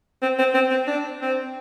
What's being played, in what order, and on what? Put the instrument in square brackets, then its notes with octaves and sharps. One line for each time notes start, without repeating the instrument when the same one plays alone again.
[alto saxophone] C4
C4
C4
C4
D4
C4